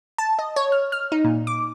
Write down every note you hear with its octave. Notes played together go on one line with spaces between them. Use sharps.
A5
D#5
C#5
F6
F6
D#4
A#2
D6